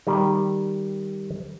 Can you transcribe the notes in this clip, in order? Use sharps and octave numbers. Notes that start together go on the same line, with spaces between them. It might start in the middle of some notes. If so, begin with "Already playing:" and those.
D#3 G3 G4